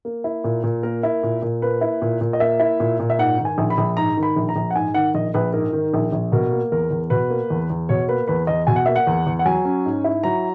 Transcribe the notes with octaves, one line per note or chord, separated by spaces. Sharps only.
A#3
E4
A#2
A#2
A#3 A#4
E4
A#2
A#2
A#3 B4
E4
A#2
A#2
D#5
A#3 E5
E4
A#2
A#2
E5
G#2 F#5
D#3
G#5
A#1
B5
A#1
G#2 A#5
D#3
B5
A#1
A#5
A#1
F#5
G#2 G#5
D#3 F#5
A#1 D#5
A#1 B4
G#2 A#4
D#3
A#1
A#1
B2 A#4
A#3
E2 A#4
E2
B2 B4
A#3
E2
E2
B2 C#5
A#3 B4
E2 B4
E2 D#5
B2 G#5
F#5
A#3 E5
F#5
E2
E2
F#5
F#3 G#5
C#4
G#2
E4
F#3 A#5